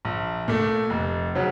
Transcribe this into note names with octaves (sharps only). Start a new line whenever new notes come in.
A#1
A#2 A3
F1
C#3 F#3